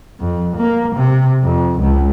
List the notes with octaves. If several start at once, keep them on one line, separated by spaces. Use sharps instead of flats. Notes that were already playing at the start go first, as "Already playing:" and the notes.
F2
A#3
C3
F2
C#2